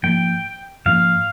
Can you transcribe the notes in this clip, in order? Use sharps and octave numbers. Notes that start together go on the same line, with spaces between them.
G#2 F3 A#3 G5
G#2 F3 A#3 F5